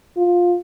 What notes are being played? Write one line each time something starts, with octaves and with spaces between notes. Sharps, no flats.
F4